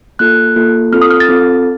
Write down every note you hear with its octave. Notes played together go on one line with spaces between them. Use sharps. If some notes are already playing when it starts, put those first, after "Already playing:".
A#3 F4 A4 F#6
A#3 F4 A4
C4 F4 A4 F6
D#6
F6
A6
C4 F4 A4